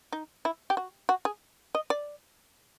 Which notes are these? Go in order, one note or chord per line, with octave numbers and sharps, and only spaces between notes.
D#4
E4
G4
F#4
F#4
G#4
D#5
D5